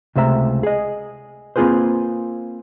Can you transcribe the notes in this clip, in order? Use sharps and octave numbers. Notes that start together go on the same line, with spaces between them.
C#2 C3 A3 C5 E5 A#5
G#4 D#5
A#3 C4 F4 G#4 B4 C5